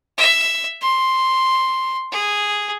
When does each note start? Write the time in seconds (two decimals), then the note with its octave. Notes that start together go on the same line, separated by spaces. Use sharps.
0.17 E5
0.81 C6
2.12 G#4